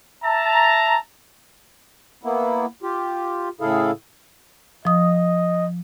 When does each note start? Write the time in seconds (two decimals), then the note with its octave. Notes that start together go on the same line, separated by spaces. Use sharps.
0.24 E5 A5 A#5
2.23 A#3 B3 E4
2.83 F4 G4
3.61 A2 C#3 E4 G#4 A4 F5
4.85 F3 D#5 D#6